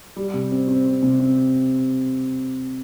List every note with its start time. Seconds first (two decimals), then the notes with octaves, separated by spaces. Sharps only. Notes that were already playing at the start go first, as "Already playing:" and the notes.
0.16 G3
0.34 C3
0.51 C4
0.68 C4
0.85 C4
1.03 C3
1.19 C4